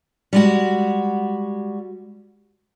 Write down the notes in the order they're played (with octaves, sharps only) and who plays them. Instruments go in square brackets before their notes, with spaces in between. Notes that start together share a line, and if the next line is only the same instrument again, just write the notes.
[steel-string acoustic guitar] G3 G#3 F#4